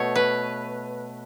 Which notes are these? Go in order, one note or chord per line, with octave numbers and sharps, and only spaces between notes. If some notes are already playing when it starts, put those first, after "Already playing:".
Already playing: B2 A3 C#5
B4